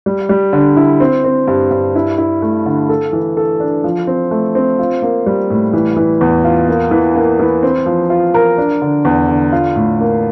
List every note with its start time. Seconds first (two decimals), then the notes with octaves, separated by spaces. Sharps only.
0.06 G3
0.29 G3
0.53 D3
0.77 E4
1.00 C4
1.24 C4
1.48 G2
1.71 G2
1.95 E4
2.18 E4
2.42 A3
2.66 D3
2.89 A4
3.13 E3
3.37 A4
3.60 D4
3.84 F3
4.07 C4
4.31 A3
4.55 C4
4.79 F4
5.02 A#3
5.26 G3
5.50 A2
5.73 E3
5.97 E3
6.21 E2
6.45 F4
6.68 A#3
6.91 E3
7.15 A#3
7.39 E3
7.63 C4
7.86 F3
8.10 F4
8.34 A#4
8.58 D4
8.82 D3
9.05 E2
9.28 D3
9.52 F4
9.76 A2
10.00 A#3